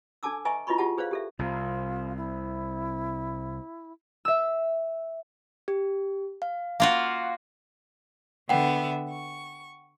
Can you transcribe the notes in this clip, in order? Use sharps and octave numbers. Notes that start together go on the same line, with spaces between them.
D4 A4 G#5 A5 D6 E6
B4 D#5 E5 G#5 A#5 C#6
E4 F4 B4 D#5 B5 C#6
F4 G4 G#4 F#5 A5
G#4 B4 C5 D5 F5
G4 A4 E5
C2 C3 F4
E4
E5 E6
G4
F5
A#3 F4 F#4 F5
D3 B3 E5 F#5 G5
C#6